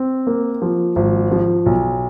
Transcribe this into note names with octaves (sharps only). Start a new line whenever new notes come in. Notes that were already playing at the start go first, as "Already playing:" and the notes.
Already playing: C4
A#3
F3
G#1
F3
B1